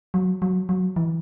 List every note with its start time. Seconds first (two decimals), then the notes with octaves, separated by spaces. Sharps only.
0.14 F#3
0.42 F#3
0.69 F#3
0.96 E3